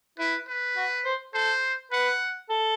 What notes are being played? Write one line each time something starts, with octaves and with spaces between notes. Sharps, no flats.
E4 B4
B4
F#4
C5
A4 C5
B4 F#5
A4